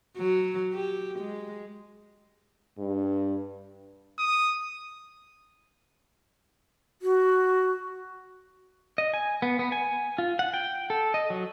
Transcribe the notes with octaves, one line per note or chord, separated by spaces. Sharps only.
F#3
G4
G#3
G2
D#6
F#4
D#5
G#5
B3
B3
G#5
F4
F#5
G5
A4
D#5
F#3